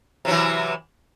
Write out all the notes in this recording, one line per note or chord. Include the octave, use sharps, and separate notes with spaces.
C3 E3 F#3